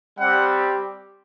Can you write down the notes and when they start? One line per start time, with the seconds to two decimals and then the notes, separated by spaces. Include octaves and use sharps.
0.19 G3 C4 G4 F#5